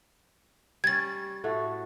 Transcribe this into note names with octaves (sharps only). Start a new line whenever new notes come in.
G3 C#4 G#6 A6
A2 A3 F#4